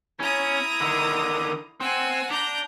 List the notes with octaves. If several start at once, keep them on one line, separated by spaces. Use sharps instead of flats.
C#4 E4 A#5 D#6
D3 D#3
C4 F#5 G#5 E6
D4 A#5 G6